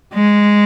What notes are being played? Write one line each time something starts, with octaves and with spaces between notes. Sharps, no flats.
G#3